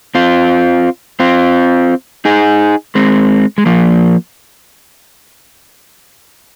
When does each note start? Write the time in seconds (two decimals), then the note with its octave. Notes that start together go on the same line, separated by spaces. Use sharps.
0.15 C4 F4
1.20 C4 F4
2.25 D#4 G#4
2.95 G#3 C4
3.58 G#3
3.66 F3 A#3